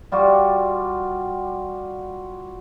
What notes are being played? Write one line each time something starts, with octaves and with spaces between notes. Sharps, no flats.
G3 F4 F#4 D5